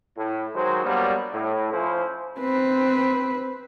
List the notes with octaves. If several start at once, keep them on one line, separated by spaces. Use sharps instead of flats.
A2
D#3 F#3 G#3 C5
F#3 G3 A#3 B3 D4
A2
F3 C#4 E4 F4 C5
C4 B4